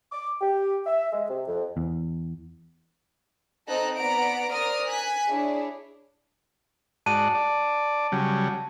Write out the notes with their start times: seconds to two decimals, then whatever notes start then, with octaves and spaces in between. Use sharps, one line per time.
0.12 D6
0.41 G4
0.86 E5
1.13 G#3
1.29 C3
1.48 F2
1.77 E2
3.68 C4 D#4 A4 D#5 A#5 F#6
3.97 B3 D5 F#5 A#5 D7
4.51 A#4 C5 D5 D#6 F6
4.88 G#5 F#6 B6
5.28 D4 E4 G#4 C#5
7.06 G#2 F#4 D5 A5 D#7
7.35 D5
8.12 C#3 F#3 G3